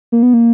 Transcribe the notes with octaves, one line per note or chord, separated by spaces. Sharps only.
A#3
B3
A#3